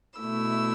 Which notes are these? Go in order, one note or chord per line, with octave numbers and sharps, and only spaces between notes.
B2 A3 E4 E6